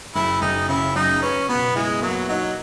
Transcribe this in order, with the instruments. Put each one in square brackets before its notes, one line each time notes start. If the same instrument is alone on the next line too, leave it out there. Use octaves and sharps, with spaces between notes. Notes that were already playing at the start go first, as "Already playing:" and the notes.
[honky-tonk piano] F#1 [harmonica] E4
[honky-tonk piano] F#1 [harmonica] D#4
[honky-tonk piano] C#3 [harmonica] E4
[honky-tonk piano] F#2 [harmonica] D#4
[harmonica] C#4 [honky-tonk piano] B4
[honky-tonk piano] B2 [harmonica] B3
[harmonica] G#3 [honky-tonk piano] E4
[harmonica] F#3 [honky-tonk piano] A#3
[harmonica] F#3 [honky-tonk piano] D#4